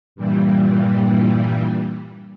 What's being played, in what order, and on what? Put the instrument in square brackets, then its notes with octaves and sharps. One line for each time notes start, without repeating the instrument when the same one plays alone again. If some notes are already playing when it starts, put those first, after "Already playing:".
[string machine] G2 A#2 E3 G3